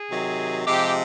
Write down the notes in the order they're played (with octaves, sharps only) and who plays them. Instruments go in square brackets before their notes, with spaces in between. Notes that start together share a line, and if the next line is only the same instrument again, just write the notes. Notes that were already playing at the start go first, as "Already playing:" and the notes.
Already playing: [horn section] G#4
C3 D#3 F#3
C3 F3 G#3 G4